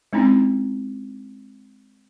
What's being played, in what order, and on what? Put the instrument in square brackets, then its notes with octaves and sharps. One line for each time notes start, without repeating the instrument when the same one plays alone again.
[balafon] G#3 C4 C#4 D#4 E4